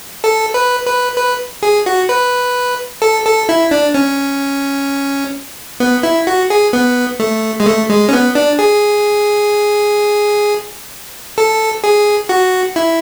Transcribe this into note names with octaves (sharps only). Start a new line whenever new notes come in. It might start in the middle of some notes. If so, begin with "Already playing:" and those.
A4
B4
B4
B4
G#4
F#4
B4
A4
A4
E4
D4
C#4
B3
E4
F#4
G#4
B3
A3
G#3
A3
G#3
C#4
B3
D4
G#4
A4
G#4
F#4
E4